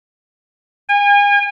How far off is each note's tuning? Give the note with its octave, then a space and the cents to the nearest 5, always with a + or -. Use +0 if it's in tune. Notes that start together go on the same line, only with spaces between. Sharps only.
G#5 -35